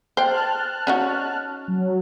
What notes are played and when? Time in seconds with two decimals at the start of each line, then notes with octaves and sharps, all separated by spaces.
0.17 C5 G5 A5 F6 F#6
0.87 C#4 D#4 F#4
1.68 F#3